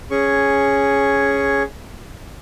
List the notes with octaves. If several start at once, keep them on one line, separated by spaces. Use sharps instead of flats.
C#4 G#4 C#6